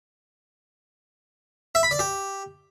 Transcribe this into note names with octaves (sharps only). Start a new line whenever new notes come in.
E5
B5
D5
G4